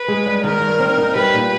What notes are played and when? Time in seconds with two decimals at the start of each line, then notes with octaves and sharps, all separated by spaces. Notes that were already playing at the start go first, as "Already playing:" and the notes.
Already playing: B4
0.08 G#3
0.26 G2
0.44 D#3 A#4
0.61 G2
0.80 C4
0.98 D#4
1.16 G3 B4
1.34 A#2